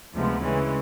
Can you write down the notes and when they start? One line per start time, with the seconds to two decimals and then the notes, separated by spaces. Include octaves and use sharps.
0.13 D2 C3 F3 G#3 B3
0.41 C#3 E3 G#3 C#4